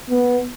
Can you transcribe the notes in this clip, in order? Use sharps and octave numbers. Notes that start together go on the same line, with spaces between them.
B3